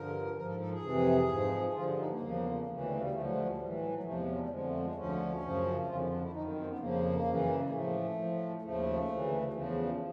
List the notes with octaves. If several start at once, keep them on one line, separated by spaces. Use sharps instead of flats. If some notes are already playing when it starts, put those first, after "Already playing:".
Already playing: G2 D3 F3 A#4
G#2 F3 A#4
A4
A4
G#4
F2 C3 E3
G#2 F3
G2 D3 F3 F4
D#4
A#3
E2 C#3 F3
D2 C#3 E3
G3
G3
D2 D3 F3 A3
F#3
G3
G3
A2 E3 G3
F#3
F#3
F#3
E2 C3 F3 A3
G#3
F#3
G3
F2 D3 F3 G#3
A3
G#3
D2 D3 F3 C#4
F#2 C#3 F3
F2 D3 F3 F4
E4
D4
E4
F#2 D#3 D#4
C4
C4
B3
F2 C#3 F3 A#3
F#2 C#3 E3
G#3
A2 F3 A3
A2 F3
D#2 C#3 F3 A3
D2 C#3 E3
E2 C#3 F3